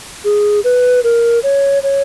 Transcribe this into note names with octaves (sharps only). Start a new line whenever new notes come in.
G#4
B4
A#4
C#5
C#5